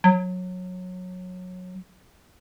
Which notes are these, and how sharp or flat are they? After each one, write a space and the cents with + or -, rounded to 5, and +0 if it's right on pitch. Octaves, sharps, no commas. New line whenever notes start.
F#3 -20